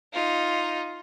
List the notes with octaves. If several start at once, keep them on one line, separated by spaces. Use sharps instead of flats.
D#4 F4